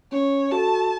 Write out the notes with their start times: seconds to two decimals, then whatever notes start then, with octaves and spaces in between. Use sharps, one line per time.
0.11 C#4 C#5
0.51 F#4 A4 A5